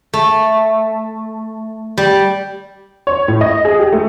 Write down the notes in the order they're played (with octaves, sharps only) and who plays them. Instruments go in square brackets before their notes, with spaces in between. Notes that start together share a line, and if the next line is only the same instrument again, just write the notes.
[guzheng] A3
G3
[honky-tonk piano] C#5
A2
D#5
G#4
G4
A3